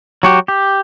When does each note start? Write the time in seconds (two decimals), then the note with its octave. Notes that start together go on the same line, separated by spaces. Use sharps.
0.23 F#3 F#4 G4
0.48 G4